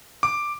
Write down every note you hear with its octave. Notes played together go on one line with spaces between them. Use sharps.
D6